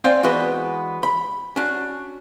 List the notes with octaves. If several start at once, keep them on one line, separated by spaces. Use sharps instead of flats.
C4 C5 D5 F5 G5 G#5
E3 G#3 B3 F#4 B4 D#5
B5
C#4 D4 F#4